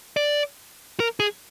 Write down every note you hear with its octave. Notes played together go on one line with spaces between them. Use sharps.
D5
A#4
G#4